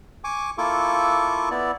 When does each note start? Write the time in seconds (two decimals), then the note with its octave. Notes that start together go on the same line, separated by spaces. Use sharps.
0.24 G#5 C#6 D6
0.58 A#3 E4 F4 A4 C#6 D6
1.51 B3 E4 D5